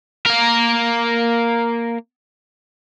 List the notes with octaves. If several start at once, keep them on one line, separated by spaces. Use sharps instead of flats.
A#3 A#4